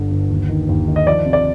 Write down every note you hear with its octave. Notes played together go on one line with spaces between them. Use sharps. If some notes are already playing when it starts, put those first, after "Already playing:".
Already playing: G1 G2 D3
G1
D#2
D#3
D#2
D#3
D#5
F3 D5
C3
D5